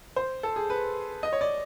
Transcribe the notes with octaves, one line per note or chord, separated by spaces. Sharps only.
C5
A4
G#4
B4
D#5
C#5
D5